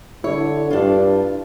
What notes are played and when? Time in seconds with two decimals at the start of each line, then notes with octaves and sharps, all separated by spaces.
0.24 D3 E4 C#5
0.70 G2 D4 F4